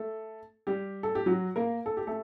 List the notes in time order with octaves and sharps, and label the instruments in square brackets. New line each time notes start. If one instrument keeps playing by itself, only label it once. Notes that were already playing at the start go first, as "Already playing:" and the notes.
Already playing: [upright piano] A3 A4
G3 G4
A4
G4
F#3 F#4
A#3 A#4
A4
G4
A3 A4